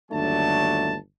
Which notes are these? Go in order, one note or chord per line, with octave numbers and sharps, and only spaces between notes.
G1 D#2 F#3 A3 D4 A5